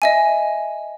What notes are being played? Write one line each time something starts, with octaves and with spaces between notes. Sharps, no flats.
D#5 E5 G#5